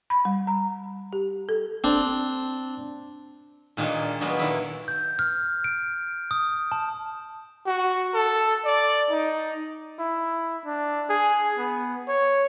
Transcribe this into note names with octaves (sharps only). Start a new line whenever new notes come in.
B5
G3
A#5
G4
A4
C4 D4
A#2 D#3 G#3 A#3 D4
A#2 F#3 G#3 A#3 B3
D#3 A#3 E4
G6
F6
D7
D#6
A5
F#4
A4
D5
D#4
E4
D4
G#4
B3
C#5